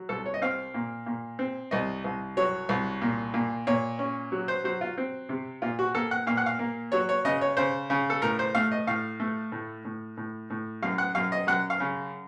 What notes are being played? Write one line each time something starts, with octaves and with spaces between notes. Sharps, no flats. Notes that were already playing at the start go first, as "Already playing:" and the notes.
Already playing: F#3
C2 A4
C#5
D#5
C4 F5
A#2
A#2
C4
C2 D#5
C2
F#3 C#5
C2
A#2
A#2
A#2 C#5
C#4
F#3
C5
F#3 C5
F4
C4
C3
A#2 F4
F#4
A#3 A4
F#5
A#2 F5
F#5
F5
A#3
F#3 C#5
C#5
C#3 D#5
C#5
C#3 C5
C#3
A4
A2 A#4
C5
A3 F5
D#5
A2 F5
A3
A2
A2
A2
A2
F#2 F5
F#5
F#2 F5
D#5
F#2 F#5
F5
C#3